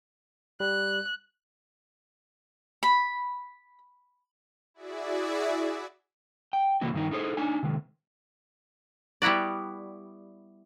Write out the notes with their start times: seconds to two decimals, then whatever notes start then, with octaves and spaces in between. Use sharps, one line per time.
0.60 G3 F#6
2.83 B5
4.74 E4 F#4 G#4 D5 E5
6.53 G5
6.81 C3 E3 A#3 E4 F#4
6.94 G2 D#3 D#4
7.11 D#4 E4 G#4 A4 C5
7.37 D4 D#4 G#5
7.63 C3 D#3 G#3
9.22 G3 B3 E4 F#4 D5